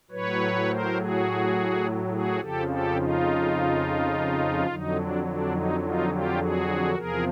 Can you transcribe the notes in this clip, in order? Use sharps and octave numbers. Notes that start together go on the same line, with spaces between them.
A2 F#3 B4 C#5
A#4 C5
F#4 G#4
F#4 G#4
F2 C#3 F3 G4 A4
G4 A4
D#4 F4
F2 D3 F#3 D#4
D4
D4
D#4
D#4 F4
F4 G4
F#4 G#4
E2 C3 F3 G#4 A#4